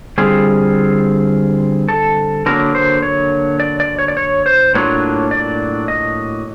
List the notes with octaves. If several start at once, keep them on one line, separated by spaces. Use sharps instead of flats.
D3 G3 C4 F4 G#4
A4
D3 F#3 A#3 A#4
C5
C#5
D5
D5
C#5
D5
C#5
C5
A2 F#3 A#3 D4 F4 C#5
D5
D#5